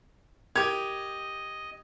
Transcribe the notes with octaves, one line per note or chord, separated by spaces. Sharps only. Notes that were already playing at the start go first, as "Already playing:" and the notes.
G4 A#4 D#5 G#6